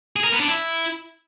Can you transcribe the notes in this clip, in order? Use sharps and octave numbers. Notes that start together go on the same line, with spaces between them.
G#4
A#4
B3
D4
E4